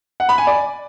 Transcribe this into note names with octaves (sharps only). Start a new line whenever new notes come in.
F#5
B5
G#5
D5